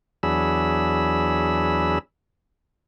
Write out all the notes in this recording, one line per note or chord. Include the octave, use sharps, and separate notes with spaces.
E2 F#3 D4 G#4 B5 E6